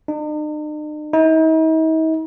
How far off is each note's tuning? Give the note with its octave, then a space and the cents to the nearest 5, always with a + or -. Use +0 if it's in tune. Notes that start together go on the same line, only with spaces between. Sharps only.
D#4 -45
D#4 +45